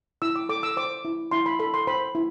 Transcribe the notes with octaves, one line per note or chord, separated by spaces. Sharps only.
E4 E6
D6
A4 D6
E6
C5 D6
E4
E4 C6
B5
A4 B5
C6
C5 B5
E4